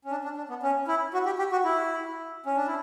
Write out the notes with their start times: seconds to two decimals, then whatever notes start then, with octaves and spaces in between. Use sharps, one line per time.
0.05 C#4
0.11 D4
0.24 D4
0.37 D4
0.49 B3
0.63 C#4
0.88 E4
1.14 F#4
1.26 G4
1.38 G4
1.52 F#4
1.64 E4
2.46 C#4
2.57 D4
2.67 E4